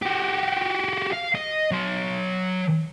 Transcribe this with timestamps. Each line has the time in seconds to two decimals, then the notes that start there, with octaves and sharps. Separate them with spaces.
0.02 F#4 G4
1.13 F5
1.35 D#5
1.71 F#3 C6